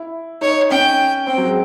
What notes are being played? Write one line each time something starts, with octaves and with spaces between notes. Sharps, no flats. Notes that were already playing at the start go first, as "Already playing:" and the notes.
Already playing: E4
D#4 C#5
C#4 G5
C4 G5
F#3
G#3